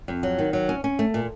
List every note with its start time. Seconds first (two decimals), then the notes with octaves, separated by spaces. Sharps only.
0.08 F2
0.23 F#3
0.38 D#3
0.53 F#3
0.69 C#4
0.84 C#4
0.99 A3
1.14 A#2